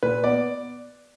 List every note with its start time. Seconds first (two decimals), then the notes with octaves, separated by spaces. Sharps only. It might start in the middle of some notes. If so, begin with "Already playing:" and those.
0.03 A#2 B4
0.24 B3 D5